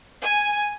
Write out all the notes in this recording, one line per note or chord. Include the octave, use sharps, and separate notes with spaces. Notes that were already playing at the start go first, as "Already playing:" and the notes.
G#5